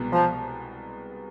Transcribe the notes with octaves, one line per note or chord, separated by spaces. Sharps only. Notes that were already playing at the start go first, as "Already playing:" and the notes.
Already playing: C2 B2 G#3 B3
F3